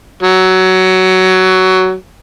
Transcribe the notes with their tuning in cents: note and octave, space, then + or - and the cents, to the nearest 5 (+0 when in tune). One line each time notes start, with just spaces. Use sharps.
F#3 +15